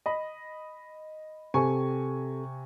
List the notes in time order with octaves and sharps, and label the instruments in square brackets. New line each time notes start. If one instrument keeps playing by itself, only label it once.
[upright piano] D#5 B5
[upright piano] C3 G#5 C#6 [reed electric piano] C4 G4 A4